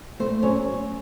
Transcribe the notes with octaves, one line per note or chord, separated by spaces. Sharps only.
A3 C4 C5
F#3 C#4 C#5